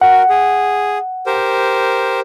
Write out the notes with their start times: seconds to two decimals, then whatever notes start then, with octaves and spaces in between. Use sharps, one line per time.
0.01 F#4 A#4 F#5
0.29 G#4
1.26 G4 A#4 C5